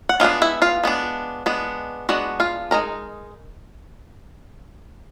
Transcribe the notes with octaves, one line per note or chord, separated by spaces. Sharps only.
F#5
G#3 B3 D4 F4 F5
E4 E5
F4 F5
G#3 B3 D4
G#3 B3 D4
G#3 B3 D4 F#4 F#5
F4 F5
G#3 C4 D#4 A#4 A#5